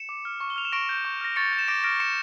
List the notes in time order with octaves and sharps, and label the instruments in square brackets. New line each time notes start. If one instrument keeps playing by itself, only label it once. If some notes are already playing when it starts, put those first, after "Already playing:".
Already playing: [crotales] C#7 E7
D6
F6
C#6
G7
F6 F7
E7
C#6 A#6 D7
G6
C#6
F6 A#6
C#6 A6 C#7
G6
E7
D6 A#6 D7
F6 A#6 D7
C#6 C#7 E7